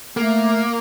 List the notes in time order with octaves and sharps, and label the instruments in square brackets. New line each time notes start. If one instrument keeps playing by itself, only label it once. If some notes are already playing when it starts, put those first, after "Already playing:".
[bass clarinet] A3 [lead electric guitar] A#3